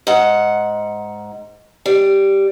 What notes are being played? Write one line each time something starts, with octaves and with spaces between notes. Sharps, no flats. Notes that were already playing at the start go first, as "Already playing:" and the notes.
G#2 F#5
G3